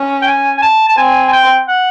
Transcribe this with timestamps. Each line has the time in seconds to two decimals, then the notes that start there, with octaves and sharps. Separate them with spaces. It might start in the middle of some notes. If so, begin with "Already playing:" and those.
Already playing: C#4
0.22 G5
0.27 G#5
0.58 G#5
0.62 A5
0.89 A5
0.97 C4 G#5
1.28 G#5
1.32 G5
1.68 F#5